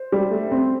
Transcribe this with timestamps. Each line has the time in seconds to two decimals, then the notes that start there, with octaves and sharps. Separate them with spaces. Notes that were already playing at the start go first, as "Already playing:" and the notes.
Already playing: C5
0.12 G3
0.31 A3
0.52 C4